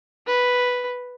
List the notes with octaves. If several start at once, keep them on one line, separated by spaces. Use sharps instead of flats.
B4